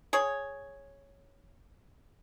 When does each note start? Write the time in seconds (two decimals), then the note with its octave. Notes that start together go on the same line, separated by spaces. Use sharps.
0.13 G#4 C#5